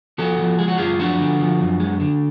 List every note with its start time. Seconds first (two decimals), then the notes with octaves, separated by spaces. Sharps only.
0.18 F3 F#4 A4
0.38 F3
0.59 G#3 G#4
0.68 F#4
0.78 F#2 F4 G#4
0.99 F3 D4 F#4
1.19 D3
1.39 F3
1.61 F#2
1.80 G#3
2.00 D3